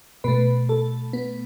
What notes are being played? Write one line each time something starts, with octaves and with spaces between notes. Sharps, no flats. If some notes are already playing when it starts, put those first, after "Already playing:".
B2 A3 B4
A4
B3